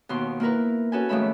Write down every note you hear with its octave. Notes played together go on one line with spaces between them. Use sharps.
D#2 B2 C6
A#3 E4 A#4 B4
C#4 F#4 A4 B4 G#5
D#2 G#2 F3 A3 E5 B5